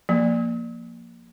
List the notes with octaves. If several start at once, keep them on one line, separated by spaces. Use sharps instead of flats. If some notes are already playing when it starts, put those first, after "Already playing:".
F3 A#3